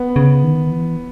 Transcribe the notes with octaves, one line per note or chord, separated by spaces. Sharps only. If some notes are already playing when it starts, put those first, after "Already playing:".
Already playing: B3
C#3
D#3
E3